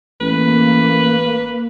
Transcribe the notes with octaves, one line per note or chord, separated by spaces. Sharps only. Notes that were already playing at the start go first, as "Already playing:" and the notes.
A1 A#3 B4